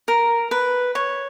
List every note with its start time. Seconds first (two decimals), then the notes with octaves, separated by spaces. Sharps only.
0.08 A#4
0.51 B4
0.95 C#5